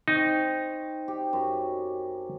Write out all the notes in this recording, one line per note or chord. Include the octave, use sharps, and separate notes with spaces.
C4 D#4 C#6
G4
F#2